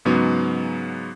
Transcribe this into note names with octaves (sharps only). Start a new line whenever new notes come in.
G#2 C#3 F#3 B3 D#4 F#4